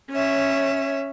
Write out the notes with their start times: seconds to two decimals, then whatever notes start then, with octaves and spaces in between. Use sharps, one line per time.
0.11 C#4 C#5 E5